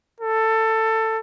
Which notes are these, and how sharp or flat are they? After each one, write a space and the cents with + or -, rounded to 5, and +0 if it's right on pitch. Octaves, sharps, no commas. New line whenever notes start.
A4 +15